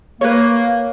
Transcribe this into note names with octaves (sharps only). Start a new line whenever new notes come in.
A#3 B4 C#5